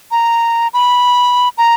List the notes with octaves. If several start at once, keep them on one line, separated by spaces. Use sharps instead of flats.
A#5
B5
A#5